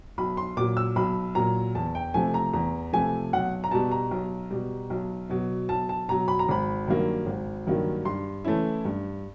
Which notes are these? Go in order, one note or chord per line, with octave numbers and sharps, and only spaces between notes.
B1 B5
C6
A#2 F#3 D6
E6
B1 B5
A#2 F#3 A#5
E2 A5
G5
C3 F3 A3 G#5
A#5
E2 A#5
C3 F3 A3 G#5
B1 F#5
A#5
B2 G3 A5
A#5
B1
B2 G3
B1
B2 F#3
B1 A5
A5
B2 F#3 A#5
B5
A#5
G#1 B5
G2 D#3 F#3 A#3
G#1
G2 D#3 F#3 A#3
G2 C6
E3 A3 C#4 E4
G2